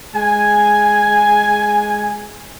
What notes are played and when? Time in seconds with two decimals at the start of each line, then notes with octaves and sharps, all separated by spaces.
0.15 G#3 G#5